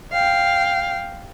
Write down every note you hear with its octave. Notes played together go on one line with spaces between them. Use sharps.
F5 G5